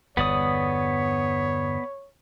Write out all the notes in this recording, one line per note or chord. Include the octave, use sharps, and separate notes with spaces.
G1 E2 B3 C#5 D5 D#6